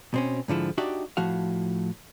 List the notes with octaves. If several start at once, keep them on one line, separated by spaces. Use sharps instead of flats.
B2 C4 C#4
G#2 D3 F3 E4
D4 D#4 F#4 G4 D5 E5
A2 F3 F#4 F5